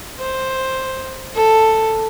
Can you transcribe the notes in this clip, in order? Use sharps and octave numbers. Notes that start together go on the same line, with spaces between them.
C5
A4